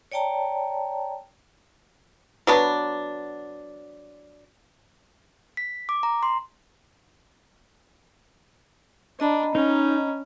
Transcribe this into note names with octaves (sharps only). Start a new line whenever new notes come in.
C#5 D5 G5 A5 A#5
F#3 B3 D4
B6
D6
A#5
C6
D4 D#5 A#5 B5
C#4 D#4